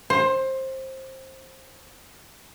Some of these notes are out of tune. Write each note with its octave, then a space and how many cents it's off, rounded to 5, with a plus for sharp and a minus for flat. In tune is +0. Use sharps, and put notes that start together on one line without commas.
C5 +20